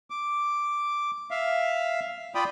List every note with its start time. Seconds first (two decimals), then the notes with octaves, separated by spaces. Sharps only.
0.10 D6
1.31 E5 F5
2.35 F4 D5 G5 B5 D#6